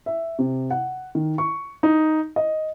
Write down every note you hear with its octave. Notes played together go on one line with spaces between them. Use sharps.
E5
C3
F#5
D#3
C#6
D#4
D#5